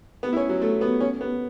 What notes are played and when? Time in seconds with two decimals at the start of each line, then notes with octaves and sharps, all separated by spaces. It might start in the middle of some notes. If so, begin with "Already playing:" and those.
0.23 B3
0.33 E4
0.37 C#4
0.49 F#3
0.62 A3
0.81 B3
1.01 C#4
1.21 B3